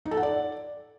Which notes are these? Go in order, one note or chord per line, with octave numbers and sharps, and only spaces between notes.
D#4
A4
F#5
D5